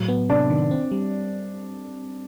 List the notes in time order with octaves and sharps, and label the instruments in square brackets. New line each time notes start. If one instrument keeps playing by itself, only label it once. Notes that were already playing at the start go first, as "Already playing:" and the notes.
Already playing: [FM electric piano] A2 F#3
B3
[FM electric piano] C3 [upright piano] D4
[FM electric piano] D#3
C4
G3